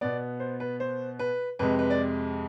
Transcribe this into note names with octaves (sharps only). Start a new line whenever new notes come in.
B2 B3 D5
C5
B4
C5
B4
F2 C3 G#3 B4
B4
D5